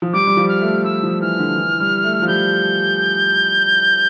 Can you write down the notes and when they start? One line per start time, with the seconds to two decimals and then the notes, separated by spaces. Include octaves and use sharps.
0.02 F3
0.13 G3 D6
0.27 G3
0.37 F3
0.48 F6
0.61 A3
0.84 G3 E6
1.03 F3
1.21 E3 F6
1.39 D3
1.56 E3
1.80 G3
2.04 A3
2.22 F3
2.28 G3 G6